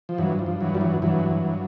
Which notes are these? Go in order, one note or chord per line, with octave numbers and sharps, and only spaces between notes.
F3
G2 E3 F#3
F3
G2
E3 F#3
G2 G3
E3 F#3
G2 E3 F#3
G2